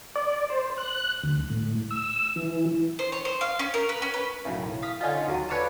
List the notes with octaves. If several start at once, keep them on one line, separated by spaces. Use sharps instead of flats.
D5
C5
F#6
D2
A2
E6
E3
C5
C#5
C5
F5
C#4
A#4
B4
C#4
B4
B1 F#2 A2 C#3
F5 D#6 B6
D3 C#4 D#4 F4
D#2 F#3 D#7
A4 B4 C#5 D5 F5 A5